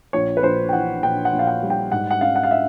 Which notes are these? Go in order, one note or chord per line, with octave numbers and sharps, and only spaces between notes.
A#1 C#5
B4
A#1 C5
G5
E3 F#5
A#1 G5
F#5
A#1
F5
F#5
G3
G5
G#2 F#5
F#5
C#4 F5
F#5
F5
E5